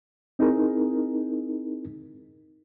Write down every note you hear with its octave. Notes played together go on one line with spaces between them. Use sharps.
C4 D#4 E4 G#4 A#4